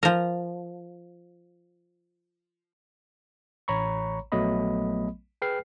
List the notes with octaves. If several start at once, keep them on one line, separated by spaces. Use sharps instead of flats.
F3 A#4
A1 C#5 A#5 B5 C#6
A#1 F#3 A3 B3 D#5 B5
G#4 B4 G5 F6 C7